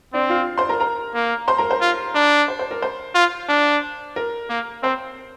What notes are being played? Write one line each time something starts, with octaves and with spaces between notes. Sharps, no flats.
C4 D4 D5
F4 F5
C5 C6
A#4 A#5
A#4 A#5
A#3
C5 C6
A#4 A#5
C5
F4
D4
C5
C5
A#4
C5
F4
D4
A#4
A#3
C4 C5